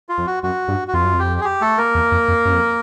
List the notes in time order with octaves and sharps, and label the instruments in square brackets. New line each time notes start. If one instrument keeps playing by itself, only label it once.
[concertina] F4
[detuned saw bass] F2
[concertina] F#4
[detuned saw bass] F#2 [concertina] F#4
[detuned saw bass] G2
[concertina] F#4
[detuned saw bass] F2 [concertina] F4
[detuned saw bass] F#2
[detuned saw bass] F2 [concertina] G4
[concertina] G#4
G4
A3 A4
A#3 A#4
[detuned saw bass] E2
F2
F2
F#2
F2